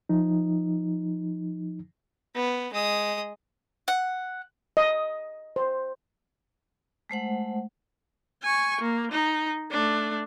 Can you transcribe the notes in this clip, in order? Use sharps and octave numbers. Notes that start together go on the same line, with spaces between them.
F3 D#4
B3
G#3 D#6
F#5
D#5
C5
G#3 A3 C5 F#5
G#5 C#6
A#3
D#4
A3 D4